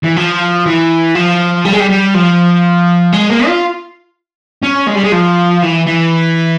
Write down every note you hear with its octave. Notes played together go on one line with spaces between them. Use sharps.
E3
F3
E3
F3
G3
G#3
G3
G3
F3
G#3
A#3
F4
C#4
G#3
G3
G#3
F3
E3
E3